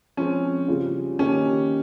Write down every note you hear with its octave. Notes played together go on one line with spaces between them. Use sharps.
F3 G#3 C4 C#4
C#3 G3 C#4 F4
D#3 A#3 C#4 D#4 G4